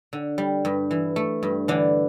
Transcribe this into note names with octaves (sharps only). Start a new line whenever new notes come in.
D3
G3
G2
E3
A3
G2
D3 E3 D4